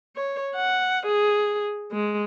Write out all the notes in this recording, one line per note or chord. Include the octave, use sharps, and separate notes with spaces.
C#5
F#5
G#4
G#3